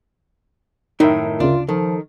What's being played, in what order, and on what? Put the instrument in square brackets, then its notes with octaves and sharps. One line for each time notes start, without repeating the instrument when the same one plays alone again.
[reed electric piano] F#2 A#4 E5 [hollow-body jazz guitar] A2 D#3 [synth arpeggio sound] D#4
[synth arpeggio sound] D2 C#3 [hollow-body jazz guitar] D4 [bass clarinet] F4
[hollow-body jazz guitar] D#3 [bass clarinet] F3 [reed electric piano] A4